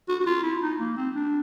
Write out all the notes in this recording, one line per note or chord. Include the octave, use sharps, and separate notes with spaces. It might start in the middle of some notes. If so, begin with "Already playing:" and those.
F#4
F#4
F4
E4
D#4
A#3
C4
D4